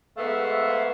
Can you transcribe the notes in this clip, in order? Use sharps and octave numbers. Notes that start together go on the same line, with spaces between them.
G#2 A3 B3 E5 F5